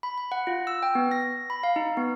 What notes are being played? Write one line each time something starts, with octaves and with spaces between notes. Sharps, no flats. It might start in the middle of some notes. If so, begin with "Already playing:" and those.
B5
B5
F#5
F4
E6
G5
B3
A#6
B5
F5
D#4
B3